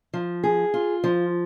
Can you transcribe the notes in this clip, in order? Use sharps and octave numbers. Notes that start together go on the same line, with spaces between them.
F3
G#4
F4
F3